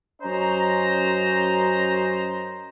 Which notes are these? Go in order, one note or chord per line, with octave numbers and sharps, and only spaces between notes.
F#2 C#4 C5 D#5 A#5